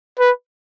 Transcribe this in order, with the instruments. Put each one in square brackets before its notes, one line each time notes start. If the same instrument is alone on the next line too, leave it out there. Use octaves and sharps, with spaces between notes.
[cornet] B4